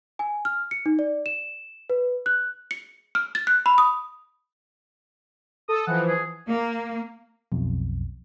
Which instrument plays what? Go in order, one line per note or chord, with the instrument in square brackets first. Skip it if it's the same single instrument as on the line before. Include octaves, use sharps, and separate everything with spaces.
[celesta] G#5
F6
C#7
D#4
D5
E7
B4
F#6
[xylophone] C#7
F6
A6
F#6
B5
D#6
[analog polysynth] A4 [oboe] D#6
[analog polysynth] E3 F3 [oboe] F#5
[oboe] G#4
[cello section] A#3
[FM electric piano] B1 F2